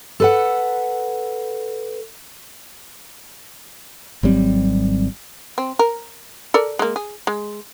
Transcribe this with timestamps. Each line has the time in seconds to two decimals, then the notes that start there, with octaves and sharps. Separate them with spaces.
0.20 A4 B4 F#5
4.23 G#1 F#3 G3 C4
5.58 C4
5.79 A#4
6.54 A4 A#4 D5
6.79 G#3 A#3
6.96 G#4
7.27 G#3